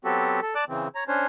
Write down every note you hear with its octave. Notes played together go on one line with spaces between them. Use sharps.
F#3 B3 C4 F#4 G4 A4
A4
D5 A5 D6 F#6
C#3 E3 C4
C#5 A#5
C#4 D4 C5 C#5